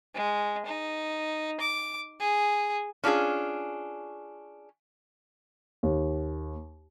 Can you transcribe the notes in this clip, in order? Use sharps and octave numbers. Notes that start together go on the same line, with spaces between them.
G#3
D#4
D6
G#4
C#4 D4 F4 F#4 G#4
D#2